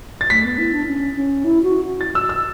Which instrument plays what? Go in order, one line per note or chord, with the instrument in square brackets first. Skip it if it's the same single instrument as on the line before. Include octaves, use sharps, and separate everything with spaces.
[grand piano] A6
[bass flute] A3 [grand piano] B6
[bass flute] B3
E4
D4
C#4
C#4
E4
F#4
[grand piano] A6
E6
E6